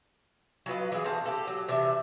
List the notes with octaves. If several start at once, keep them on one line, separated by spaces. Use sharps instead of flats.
F#3 F4 B4 D#5
E3 G#4
C4 F5 F#5 A5
G4 A4
F#3
C3 E3 D4 E5